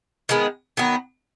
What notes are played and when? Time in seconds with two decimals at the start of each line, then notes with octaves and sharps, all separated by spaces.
0.29 D#3 G#3 B3
0.77 D#3 F#3 B3